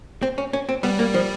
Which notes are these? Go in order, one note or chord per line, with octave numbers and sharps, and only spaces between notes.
C4
C#4
C#4
C4
G3 B3
A#3
F3